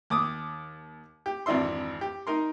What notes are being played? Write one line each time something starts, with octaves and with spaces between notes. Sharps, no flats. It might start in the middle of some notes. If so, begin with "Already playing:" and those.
D#2 D6 D#6
G4
G#1 F2 E3 D4 E5 C6
G4
D#4 A#4 C6